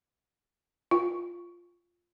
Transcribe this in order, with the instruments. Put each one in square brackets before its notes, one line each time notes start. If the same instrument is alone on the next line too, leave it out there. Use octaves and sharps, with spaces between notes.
[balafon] F4